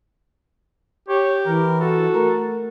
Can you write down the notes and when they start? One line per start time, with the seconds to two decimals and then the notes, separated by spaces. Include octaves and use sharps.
1.08 G4 C#5
1.46 E3 A#4
1.81 F#4 A4
2.14 A3 A#4